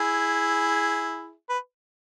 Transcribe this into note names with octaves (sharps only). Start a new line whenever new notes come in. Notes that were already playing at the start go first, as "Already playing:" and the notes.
Already playing: E4 G#4
B4